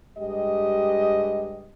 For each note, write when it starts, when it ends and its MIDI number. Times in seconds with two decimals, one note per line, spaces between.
0.18 1.72 43
0.18 1.72 56
0.18 1.72 67
0.18 1.72 75